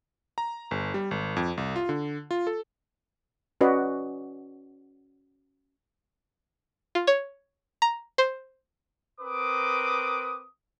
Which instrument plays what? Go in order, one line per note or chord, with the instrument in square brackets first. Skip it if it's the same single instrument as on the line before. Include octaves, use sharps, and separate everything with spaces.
[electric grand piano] A#5
G1
G3
G#1
F2
C2
F4
D3
F4
A4
[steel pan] C#4 F#4 B4 D5 D#5
[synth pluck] F4
C#5
A#5
C5
[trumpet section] C4 A#4 B4 D6 D#6